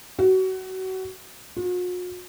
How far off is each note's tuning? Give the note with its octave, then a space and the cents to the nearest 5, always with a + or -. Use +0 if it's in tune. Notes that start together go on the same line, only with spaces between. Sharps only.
F#4 +30
F#4 -45